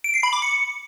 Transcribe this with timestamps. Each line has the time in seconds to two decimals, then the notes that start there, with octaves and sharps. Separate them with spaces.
0.04 D7
0.14 C7
0.23 B5
0.33 D6
0.42 C#7